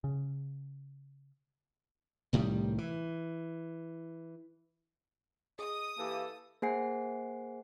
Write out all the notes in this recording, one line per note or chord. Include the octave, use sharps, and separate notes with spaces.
C#3
C2 A2 D#3 G3
E3
G#4 D#5 D#6
E3 A#3 G4 A4
A#3 G#4 C5 F#5 G#5 C7